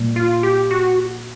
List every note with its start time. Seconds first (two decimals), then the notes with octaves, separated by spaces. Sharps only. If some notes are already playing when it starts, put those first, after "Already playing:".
Already playing: A#2 G3 A#3
0.16 F4
0.43 G4
0.71 F#4